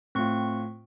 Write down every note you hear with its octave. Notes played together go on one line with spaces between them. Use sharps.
A2 C4 F4 C#6